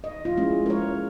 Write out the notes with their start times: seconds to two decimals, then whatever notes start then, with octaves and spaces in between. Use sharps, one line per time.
0.04 D#5
0.25 F4
0.37 G#3 C#4 E4
0.66 A#4 C#5